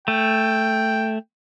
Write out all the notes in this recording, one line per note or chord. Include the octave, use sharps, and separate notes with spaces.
A3 G5